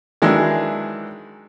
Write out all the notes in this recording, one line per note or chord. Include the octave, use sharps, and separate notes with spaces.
D#3 E3 F#3 G#3 D4